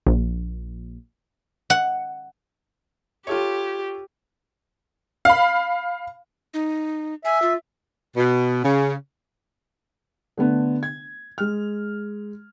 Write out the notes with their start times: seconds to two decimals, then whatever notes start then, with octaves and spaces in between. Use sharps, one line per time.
0.07 A#1
1.70 F#5
3.27 F4 G4 A4 C#5
5.25 F5 B5
6.54 D#4
7.25 E5 G#5
7.42 F4
8.17 B2
8.64 C#3
10.37 D3 A3 B3
10.83 G#6
11.38 G#3 F6